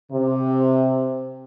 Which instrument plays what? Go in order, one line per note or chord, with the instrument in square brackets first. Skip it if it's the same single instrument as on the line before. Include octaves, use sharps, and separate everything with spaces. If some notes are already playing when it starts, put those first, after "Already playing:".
[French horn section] C3